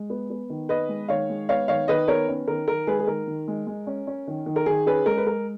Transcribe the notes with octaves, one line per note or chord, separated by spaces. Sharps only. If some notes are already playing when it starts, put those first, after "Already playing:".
Already playing: G#3
B3
B3
D#3
B3 B4 D#5
G#3
D#3 C#5 F5
G#3
B3 C#5 F5
D#3 C#5 F5
D#3 B4 D#5
B3 A#4 C#5
C#4
D#3 A#4
D#3 A#4
G#3 G#4 B4
G#4
D#3 A#4
D#3
G#3
G#3
C#4
C#4
D#3
D#3
A#4
D#3 G#4
C#4 G#4 B4
G#3 A#4
B4
G#3 A#4